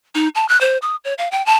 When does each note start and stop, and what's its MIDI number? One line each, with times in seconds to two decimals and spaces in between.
0.15 0.28 63
0.35 0.48 81
0.49 0.59 90
0.61 0.78 72
0.82 0.96 87
1.05 1.14 73
1.18 1.29 77
1.32 1.44 79
1.46 1.57 81